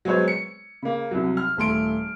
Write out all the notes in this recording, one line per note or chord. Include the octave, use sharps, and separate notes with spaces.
F#3 G#3 B3 C5 C#5
C#7
C#3 A#3
C2 F#3
F6
D#1 A3 C6 D7